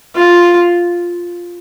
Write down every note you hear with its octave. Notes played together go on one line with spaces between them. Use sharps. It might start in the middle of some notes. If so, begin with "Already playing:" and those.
F4